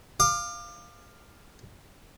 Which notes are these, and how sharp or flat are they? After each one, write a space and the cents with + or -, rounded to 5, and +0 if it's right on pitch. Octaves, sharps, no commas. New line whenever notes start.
F5 +0 D6 +30